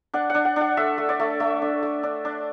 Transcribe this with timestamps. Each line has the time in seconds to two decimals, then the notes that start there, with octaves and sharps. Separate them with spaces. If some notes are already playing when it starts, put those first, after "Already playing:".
0.14 D4 F#5
0.30 D4 F#5
0.45 F#5
0.56 D4 F#5
0.77 A3 E5
0.98 A3
1.09 D5
1.19 A3
1.40 A3 E5
1.62 D4
1.83 A3
2.03 D4
2.25 D4